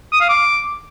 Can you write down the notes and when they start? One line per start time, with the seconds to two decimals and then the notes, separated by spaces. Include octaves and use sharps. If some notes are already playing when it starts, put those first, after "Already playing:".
0.13 D#6
0.21 F5
0.29 D6